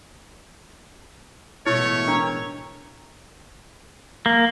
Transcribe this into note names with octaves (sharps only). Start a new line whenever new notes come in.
A1 B2 G#3 A3 E4 C#5
D4 A#4
A#3